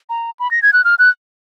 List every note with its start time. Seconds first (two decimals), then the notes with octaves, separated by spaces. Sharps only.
0.09 A#5
0.39 B5
0.51 A#6
0.62 G#6
0.73 F#6
0.85 F6
0.99 F#6